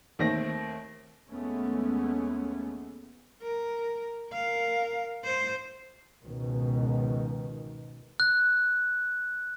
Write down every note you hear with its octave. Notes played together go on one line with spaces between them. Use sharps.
D#2 D#3 A3 C4 A#6
D#2 G#3 A3 B3 C#4
A#4
A#4 F5
C5
C#2 G#2 B2 D#3
F#6